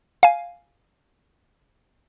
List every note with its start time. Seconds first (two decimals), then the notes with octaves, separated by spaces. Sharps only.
0.23 F5 G#5